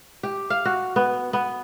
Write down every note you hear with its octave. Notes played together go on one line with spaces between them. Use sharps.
G4
F5
F#4
B3
B3